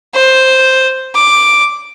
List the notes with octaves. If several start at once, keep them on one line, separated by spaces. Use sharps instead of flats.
C5
D6